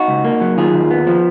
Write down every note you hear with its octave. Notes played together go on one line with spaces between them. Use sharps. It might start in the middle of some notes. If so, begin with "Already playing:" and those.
Already playing: D#4 F#4
C#2
A#3
F#3
D#3 F4 G#4
D#2
B3
F3